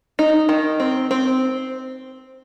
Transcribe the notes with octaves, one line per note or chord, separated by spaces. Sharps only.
D#4
D#3
C4
C4